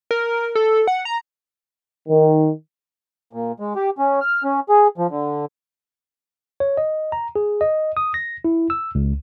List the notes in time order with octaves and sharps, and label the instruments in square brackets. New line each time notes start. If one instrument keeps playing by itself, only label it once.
[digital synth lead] A#4
A4
F#5
A#5
[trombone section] D#3
[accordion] A#2
G#3
G4
C#4
F6
C#4
G#4
F3
D3
[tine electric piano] C#5
D#5
A#5
G#4
D#5
D#6
A#6
E4
E6
C#2